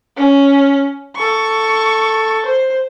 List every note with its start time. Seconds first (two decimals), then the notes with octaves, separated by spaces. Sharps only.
0.17 C#4
1.16 A4 C#6
2.46 C5